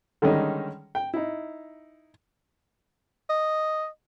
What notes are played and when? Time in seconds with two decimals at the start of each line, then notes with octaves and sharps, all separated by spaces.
0.22 D3 D#3 G3 G#3 C#4 D#4
0.95 G5
1.14 D#4 E4
3.29 D#5